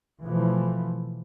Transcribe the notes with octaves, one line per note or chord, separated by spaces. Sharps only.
B2 E3 F3 A3